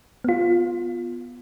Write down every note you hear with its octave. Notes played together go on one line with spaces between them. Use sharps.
B3 F4